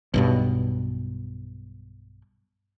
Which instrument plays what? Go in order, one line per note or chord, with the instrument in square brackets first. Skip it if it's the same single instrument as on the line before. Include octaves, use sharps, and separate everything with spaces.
[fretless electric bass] B1 G2 B2